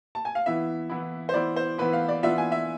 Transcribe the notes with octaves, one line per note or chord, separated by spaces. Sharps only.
A5
G#5
F5
E3 B3 E4 E5
E3 B3 E4
C5
E3 B3 E4 D5
C5
E3 B3 E4 B4
F5
D5
E3 B3 D4 F4 E5
G#5
E5